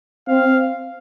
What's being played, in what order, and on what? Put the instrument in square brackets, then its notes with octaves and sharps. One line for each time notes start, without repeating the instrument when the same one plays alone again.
[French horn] C4 [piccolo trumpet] F5